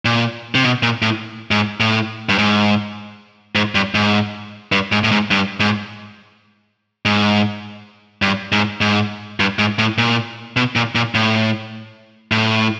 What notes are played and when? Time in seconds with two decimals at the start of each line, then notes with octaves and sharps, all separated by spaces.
0.05 A#2
0.55 C3
0.64 B2
0.83 A#2
1.02 A2
1.51 G#2
1.80 A2
2.29 G2
2.38 G#2
3.55 G#2
3.75 G2
3.95 G#2
4.72 G2
4.92 G#2
5.04 A2
5.11 G#2
5.31 G2
5.60 G#2
7.05 G#2
8.22 G2
8.52 G#2
8.81 G#2
9.40 G2
9.59 G#2
9.79 A2
9.98 A#2
10.56 B2
10.76 A#2
10.95 A#2
11.15 A2
12.32 A2